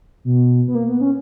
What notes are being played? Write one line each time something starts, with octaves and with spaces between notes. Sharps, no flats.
B2
B3
A#3
B3
C#4